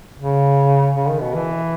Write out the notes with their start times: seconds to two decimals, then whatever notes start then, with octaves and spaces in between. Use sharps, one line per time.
0.20 C#3
0.96 C#3
1.10 D#3
1.22 B2
1.35 E3